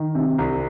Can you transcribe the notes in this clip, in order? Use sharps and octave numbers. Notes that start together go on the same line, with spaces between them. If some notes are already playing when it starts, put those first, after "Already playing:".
Already playing: D#3
C3
C2